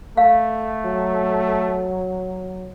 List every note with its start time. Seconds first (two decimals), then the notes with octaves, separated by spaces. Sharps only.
0.17 A3 F5
0.85 F#3